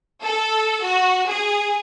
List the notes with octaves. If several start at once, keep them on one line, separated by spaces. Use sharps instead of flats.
A4
F#4
G#4